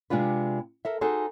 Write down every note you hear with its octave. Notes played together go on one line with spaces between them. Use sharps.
C3 G#3 D4 F4 B4
A4 A#4 E5
D#4 F#4 G#4 A4 C5